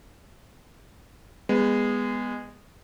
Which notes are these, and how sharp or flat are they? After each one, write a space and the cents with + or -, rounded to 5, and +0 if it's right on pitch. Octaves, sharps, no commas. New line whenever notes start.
G#3 -20 B3 +0